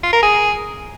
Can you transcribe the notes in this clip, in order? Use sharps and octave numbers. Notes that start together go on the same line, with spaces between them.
F4
A#4
G#4